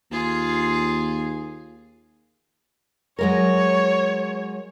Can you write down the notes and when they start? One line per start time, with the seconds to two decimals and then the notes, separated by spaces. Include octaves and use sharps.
0.11 D#2 F4 G#4
3.19 F#3 G#3 A#4 C#5